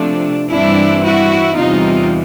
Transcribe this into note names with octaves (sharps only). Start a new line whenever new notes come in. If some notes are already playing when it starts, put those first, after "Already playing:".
Already playing: C3 F3 A3 D4
G2 E3 G3 C4 D4 E4
E4 F#4
E2 C3 E3 G3 D#4 F4